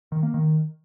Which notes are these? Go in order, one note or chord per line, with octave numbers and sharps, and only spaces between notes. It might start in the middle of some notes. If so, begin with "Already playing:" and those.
D#3
A#3
D#3